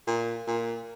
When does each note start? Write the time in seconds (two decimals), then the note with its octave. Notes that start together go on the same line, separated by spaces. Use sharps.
0.07 A#2
0.47 A#2